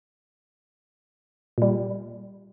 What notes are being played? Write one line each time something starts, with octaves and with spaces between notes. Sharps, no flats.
A#2 G3